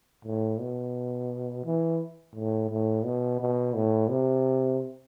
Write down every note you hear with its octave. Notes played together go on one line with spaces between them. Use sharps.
A2
B2
E3
A2
A2
B2
B2
A2
C3